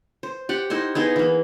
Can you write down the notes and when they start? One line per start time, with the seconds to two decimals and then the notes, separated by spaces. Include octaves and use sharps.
0.23 C5
0.49 G4 F#5 G5
0.70 D#4 E4 C5 C6
0.95 B3 D#4 E4 G#4
1.16 E3 A#3